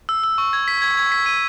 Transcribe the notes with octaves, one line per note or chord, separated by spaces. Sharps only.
E6
E6
C#6
G#6
B6
G#6
G#6
B6
D#7